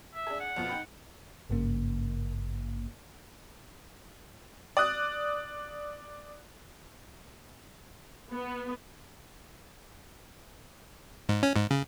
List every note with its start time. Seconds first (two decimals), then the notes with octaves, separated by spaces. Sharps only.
0.14 E5
0.27 D4 G#4
0.40 F#5
0.56 F2 B2 F4
0.69 D#4 G5 B5
1.50 G#1 G2 C#3 A#3
4.77 D5 D#6 F#6
8.32 B3
11.29 G#2
11.43 C#4
11.56 G#2
11.71 C#3